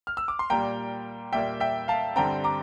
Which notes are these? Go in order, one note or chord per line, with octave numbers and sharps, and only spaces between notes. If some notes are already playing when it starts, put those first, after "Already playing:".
F6
E6
D6
C6
A#2 G3 A#3 G5 A#5
A#2 G3 A#3 E5 G5
E5 G5
F5 A5
G2 D3 G3 C4 G5 A#5
A#5 D6